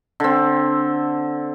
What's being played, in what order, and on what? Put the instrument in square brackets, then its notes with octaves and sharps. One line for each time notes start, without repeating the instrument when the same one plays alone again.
[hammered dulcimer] D3 C4